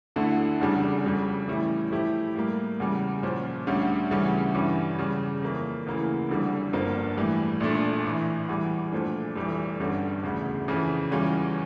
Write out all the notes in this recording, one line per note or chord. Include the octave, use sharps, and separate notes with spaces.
D2 D3 A3 E4 A4
F1 E2 C#3 G3 D4
F2 C#3 G3
A2 E3 G3 C#4 E4
A2 F3 A3 E4 G4
A2 G3 A#3
E2 C#3 G3
A#2 F3 C#4
D2 D3 G3 C#4
D2 C#3 E3 G3 C#4
G2 E3 G3 C#4
E2 C#3 G3
F2 E3 A#3
D2 C#3 E3 A#3 E4
F1 F2 D3 G3
G1 G2 F3 A#3 D4
A2 E3 G3
A#1 A#2 A3 D4
A1 A2 E3
E2 E3 G3
A#2 F3 A3 D4
F1 F2 E3 G3
G1 G2 D3 G3 C#4
E1 D2 C#3
F2 C#3 E3
E2 E3 G3 C#4 F4